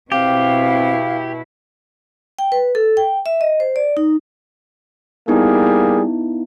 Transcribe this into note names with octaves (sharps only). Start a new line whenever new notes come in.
B2 C4 E4 G4 F5
G5
B4
A4
G5
E5
D#5
C5
D5
D#4
G3 A#3 B3 D#4 E4 G#4